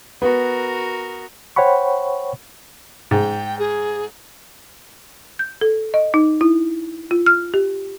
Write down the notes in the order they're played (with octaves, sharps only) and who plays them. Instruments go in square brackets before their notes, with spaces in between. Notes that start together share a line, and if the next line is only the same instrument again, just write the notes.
[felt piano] B3 [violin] F#4 A#4
[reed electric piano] C5 C#5 F#5 G5 B5 C#6
[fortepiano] G#2 [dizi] G5
[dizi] G#4
[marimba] G6
A4
D#5
D#4
E4
F4
F6
G4